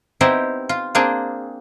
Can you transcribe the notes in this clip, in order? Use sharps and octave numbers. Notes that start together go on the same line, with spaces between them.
B3 C4 D#4 E4 G4 C5
F4
A#3 C4 D4 G#4